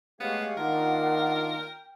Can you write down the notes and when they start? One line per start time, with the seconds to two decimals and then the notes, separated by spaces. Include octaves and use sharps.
0.20 G#3 A3 B3 G4 C#5 F5
0.57 D#3 A#3 D4 F4 A#4 F#5
1.55 G5